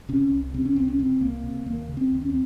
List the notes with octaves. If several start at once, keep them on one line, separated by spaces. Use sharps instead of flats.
C3 C#4
C2
C3 C4
C#4
C2 C4
C#4
C3 C4
C2 A#3
C3
D#2 A#3
C#3
C4
D#2
C#4
C4